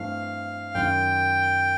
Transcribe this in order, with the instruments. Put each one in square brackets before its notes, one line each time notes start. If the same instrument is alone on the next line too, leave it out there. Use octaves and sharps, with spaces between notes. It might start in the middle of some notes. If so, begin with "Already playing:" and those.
Already playing: [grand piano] G2 E3 A3 C4 [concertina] F5
[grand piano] F#2 D#3 F#3 [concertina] G5